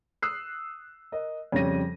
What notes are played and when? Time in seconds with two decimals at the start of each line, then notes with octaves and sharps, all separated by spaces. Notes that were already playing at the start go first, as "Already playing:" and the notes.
0.22 D#6 E6 F#6 C7
1.12 A#4 D#5
1.52 F2 C#3 G3 C#5 A#6 D#7